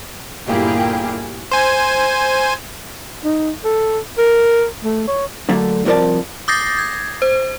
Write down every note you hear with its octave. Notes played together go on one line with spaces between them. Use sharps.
G1 A#2 A#3 E4 G4 G#4
C5 G#5
D#4
A4
A#4
A3
C#5
D3 F#3 A3 A#3
C2 F2 F3 A#4 D5 A5
D6 D#6 G6 A6 A#6 C7
G#6
C5